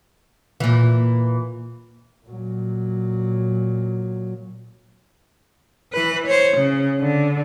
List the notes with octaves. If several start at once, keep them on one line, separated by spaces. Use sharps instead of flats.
A#2 E3
A#2 F#3
E3 B4
C5 C#5
C#3
D3